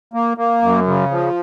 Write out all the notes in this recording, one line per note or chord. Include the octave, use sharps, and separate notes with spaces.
A#3
A#3
F#2
C#3
F3